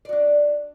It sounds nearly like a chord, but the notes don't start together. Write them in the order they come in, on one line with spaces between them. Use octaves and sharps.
D5 F#4 D4